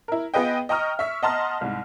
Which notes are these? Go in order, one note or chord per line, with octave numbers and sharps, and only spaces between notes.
E4 A#4
B3 F4 G#4 B4 D#5 G5
D#5 G5 A#5 C#6 D#6 F6
E5 C#6 B6
D#5 F#5 A5 A#5 C6 F6
C2 G#2